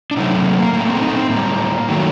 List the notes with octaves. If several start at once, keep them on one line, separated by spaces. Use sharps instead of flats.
D4
C3 F#3 A3 D#4
C4
A#3
A#3
A2 A3 A#3
C4
D#4
C4
A2 G3 A#3
D#3 F#3 A3